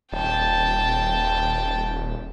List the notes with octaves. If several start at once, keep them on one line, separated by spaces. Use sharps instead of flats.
D#1 G5 A5